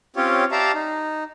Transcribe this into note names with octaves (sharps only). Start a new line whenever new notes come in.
C4 C#4 F4 G4 C#5
G4 D5 E5 F5 A5 A#5
D#4